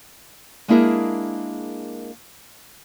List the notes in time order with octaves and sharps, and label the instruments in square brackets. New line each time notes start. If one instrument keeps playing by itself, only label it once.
[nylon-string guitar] G#3 A#3 D4 E4 G#4 A#4